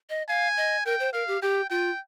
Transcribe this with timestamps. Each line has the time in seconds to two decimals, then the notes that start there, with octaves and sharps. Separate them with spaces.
0.10 D#5
0.28 F5 G#5
0.57 D#5
0.85 A#4 G5
1.00 C5
1.13 A#4 F5
1.28 G4
1.42 G4 G5
1.70 F4 G5